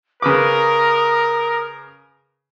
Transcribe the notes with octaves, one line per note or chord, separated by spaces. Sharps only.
C#3 A#4 B4 D6 D#6